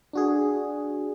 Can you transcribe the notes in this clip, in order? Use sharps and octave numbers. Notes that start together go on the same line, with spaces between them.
D4 F#4 G#4